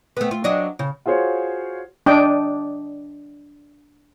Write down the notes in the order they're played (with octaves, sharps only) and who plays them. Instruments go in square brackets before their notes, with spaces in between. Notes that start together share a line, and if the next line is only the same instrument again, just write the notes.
[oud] A3 B3
F4
F#3 D4 D#5
C#3
[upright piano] F4 F#4 G#4 C5 C#5
[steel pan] D4 D#5 G5